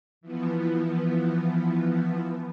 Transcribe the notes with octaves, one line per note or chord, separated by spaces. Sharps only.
E3 F3 B3